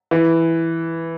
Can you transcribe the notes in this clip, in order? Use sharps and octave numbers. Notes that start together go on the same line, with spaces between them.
E3